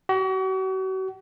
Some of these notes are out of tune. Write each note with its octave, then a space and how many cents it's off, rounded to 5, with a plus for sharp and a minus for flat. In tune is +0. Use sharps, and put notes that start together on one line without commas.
F#4 +40